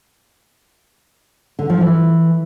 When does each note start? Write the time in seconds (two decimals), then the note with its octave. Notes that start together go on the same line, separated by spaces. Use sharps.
1.59 D3
1.70 F3
1.81 E3